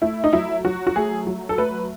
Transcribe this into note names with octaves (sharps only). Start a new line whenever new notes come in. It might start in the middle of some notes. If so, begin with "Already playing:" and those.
A3 E4
D#4
F#3 E4
F#3 F#4
F#4
A3 G#4
F#3
A4
A3 B4